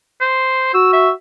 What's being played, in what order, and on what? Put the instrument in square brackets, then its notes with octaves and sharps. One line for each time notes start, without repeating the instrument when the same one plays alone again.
[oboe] C5
[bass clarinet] F#4 [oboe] E6
[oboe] E5